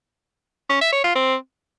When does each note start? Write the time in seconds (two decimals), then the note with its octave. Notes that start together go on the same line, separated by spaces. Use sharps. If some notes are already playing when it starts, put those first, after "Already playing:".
0.70 C#4
0.81 E5
0.92 C#5
1.04 F4
1.15 C4